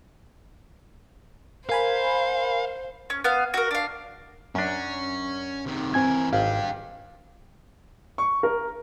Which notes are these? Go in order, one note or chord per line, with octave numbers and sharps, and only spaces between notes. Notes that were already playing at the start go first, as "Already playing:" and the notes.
A#4 C5 F5 G#5 B5
C#4
B3 F5
F#4 A#4
D4 F5
F#2 C#4 D4
C3 D#3
E3 C4 A#4 G#5 G#6
G#1 D4 G4 F5
C#6
A#4